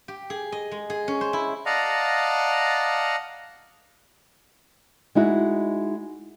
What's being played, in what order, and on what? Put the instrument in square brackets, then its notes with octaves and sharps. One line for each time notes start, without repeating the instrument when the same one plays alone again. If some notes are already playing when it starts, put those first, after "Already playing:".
[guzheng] G4
G#4
D#5
G#3
G#4
C#4
C5
E4
[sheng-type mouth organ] D5 D#5 F5 F#5 A5 A#5
[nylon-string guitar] G#3 D#4 E4 F#4